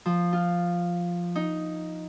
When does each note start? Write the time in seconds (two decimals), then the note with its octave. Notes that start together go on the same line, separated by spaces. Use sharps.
0.06 F3
0.33 F4
1.35 D#4